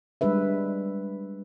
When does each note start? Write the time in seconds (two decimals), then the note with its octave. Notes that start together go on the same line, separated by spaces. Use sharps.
0.21 G3 G#3 D4 B4 E5